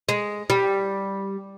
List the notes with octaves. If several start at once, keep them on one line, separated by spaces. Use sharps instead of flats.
G#3
G3